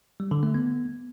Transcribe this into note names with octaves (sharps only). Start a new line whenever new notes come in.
G3
D3
A3
B3